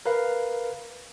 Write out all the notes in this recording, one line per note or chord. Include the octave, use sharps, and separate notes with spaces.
A#4 B4 F5